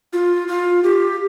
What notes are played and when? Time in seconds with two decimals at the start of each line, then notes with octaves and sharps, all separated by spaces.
0.13 F4
0.48 F4
0.84 G4